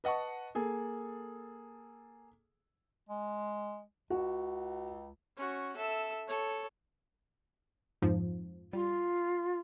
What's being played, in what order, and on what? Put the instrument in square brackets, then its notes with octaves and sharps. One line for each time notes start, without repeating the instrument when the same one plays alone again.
[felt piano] B4 D#5 F#5 A5 C#6
A#3 G#4 A4
[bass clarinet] G#3
[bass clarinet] C#2 [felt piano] F#4 F#5
[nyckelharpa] C#4 F#4
A4 E5
A4 C#5
[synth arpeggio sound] F2 G#2 F3
[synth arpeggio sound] G3 [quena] F4